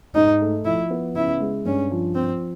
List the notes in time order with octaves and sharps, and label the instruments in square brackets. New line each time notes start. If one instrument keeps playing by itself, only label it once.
[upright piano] G#2 [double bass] D#4
[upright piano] A3
[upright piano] F3 [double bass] E4
[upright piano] B3
[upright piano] C#3 [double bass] E4
[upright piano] G#3
[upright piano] G2 [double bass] C#4
[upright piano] F3
[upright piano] F3 [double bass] C4